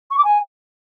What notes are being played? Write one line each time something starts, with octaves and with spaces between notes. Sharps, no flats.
C#6
D6
G#5